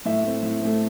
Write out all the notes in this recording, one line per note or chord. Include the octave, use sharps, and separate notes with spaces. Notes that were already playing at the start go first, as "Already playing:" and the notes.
A2 E5
A3 C4
A2
A3 C4